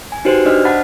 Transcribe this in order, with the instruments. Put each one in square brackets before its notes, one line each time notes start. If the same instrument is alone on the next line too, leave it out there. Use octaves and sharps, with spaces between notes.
[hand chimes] G#5
D#4 F#4 G4 B4 C5
D4 C5 D5 D#5 F6
F#5 A5 B5 A6 B6